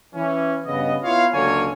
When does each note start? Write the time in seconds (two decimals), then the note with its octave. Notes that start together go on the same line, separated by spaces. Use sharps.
0.15 E3 C#4
0.66 G2 C#3 B3 D#5
1.04 B3 E4 F4 C#5 F5
1.33 C#2 D3 F#3 A#3 C#5 G#5